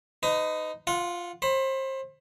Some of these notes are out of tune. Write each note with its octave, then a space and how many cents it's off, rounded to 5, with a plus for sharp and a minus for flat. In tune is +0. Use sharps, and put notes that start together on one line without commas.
D#4 +0 B4 +40
F4 +0 F#5 -30
C5 +30 B5 +15